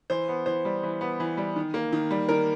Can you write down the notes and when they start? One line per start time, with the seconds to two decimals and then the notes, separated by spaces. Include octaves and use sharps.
0.10 E3 C5
0.28 B3
0.46 E3 C5
0.65 G3
0.83 E3
1.01 B3
1.20 E3
1.37 G3
1.56 D#3
1.74 A#3
1.93 D#3
2.11 G3
2.29 D#3 A#4